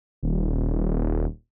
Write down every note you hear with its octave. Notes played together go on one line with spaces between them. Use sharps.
D#1